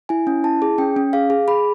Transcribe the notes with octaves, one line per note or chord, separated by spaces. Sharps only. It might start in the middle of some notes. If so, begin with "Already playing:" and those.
E4 G#5
C#4
E4 A5
G#4
C#4 G5
C#4
G#4 F5
G#4
G#4 B5